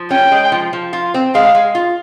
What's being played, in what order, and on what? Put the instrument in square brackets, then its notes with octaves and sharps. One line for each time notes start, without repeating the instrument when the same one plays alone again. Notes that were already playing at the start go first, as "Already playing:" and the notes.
Already playing: [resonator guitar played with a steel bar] F3
[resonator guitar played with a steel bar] C#4 [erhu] G5
[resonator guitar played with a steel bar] G#3
F3
F3
F4
C4
[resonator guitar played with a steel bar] G#3 [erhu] F5
[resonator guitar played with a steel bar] G#3
F4